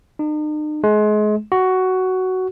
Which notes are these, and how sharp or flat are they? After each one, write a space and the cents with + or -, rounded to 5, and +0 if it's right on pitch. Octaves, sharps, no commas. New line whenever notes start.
D#4 -45
G#3 +30
F#4 +10